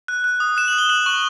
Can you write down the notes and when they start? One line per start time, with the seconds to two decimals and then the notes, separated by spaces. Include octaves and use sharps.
0.08 F#6
0.24 F#6
0.40 D#6
0.57 F#6 E7
0.68 F#7
0.73 F#6
0.78 G7
0.89 F#6 F#7
1.06 C#6 F#7